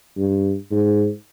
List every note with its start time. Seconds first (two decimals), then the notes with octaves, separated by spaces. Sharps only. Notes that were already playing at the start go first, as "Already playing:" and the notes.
0.17 G2
0.71 G#2